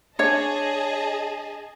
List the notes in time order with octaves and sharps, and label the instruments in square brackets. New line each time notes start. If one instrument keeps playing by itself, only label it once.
[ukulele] D4 C#5 [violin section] G#4 D#5 A5